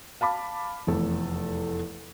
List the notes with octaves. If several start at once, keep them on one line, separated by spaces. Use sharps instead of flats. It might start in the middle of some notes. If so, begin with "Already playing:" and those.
F5 A5 B5 D6
F1 E2 A3 A4